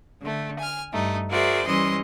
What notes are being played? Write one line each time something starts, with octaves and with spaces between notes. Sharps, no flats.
D3 A3
G#5 F6
G2 A3 D#4
F#4 G#4 A#4 C5 D5 E5
E3 G3 C#4 D#5 C6